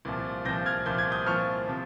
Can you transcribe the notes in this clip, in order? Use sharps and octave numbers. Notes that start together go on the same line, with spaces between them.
C2 A#2 F3
C2 A#2 F3 G6 A#6
F6 G#6
C2 A#2 F3 G6
G#6
D#6 G6
C2 A#2 F3 C#6 F6
C3 F3